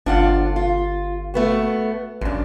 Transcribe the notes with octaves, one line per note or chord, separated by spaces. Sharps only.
G1 D4 F4 F#5
F4
A3 B3 F#4
A1 F#2 D4